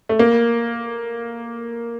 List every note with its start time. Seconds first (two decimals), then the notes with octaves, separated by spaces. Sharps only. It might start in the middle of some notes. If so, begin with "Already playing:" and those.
0.09 A3
0.19 A#3